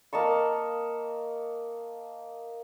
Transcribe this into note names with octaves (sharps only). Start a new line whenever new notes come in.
A#3 D#5 A5 C#6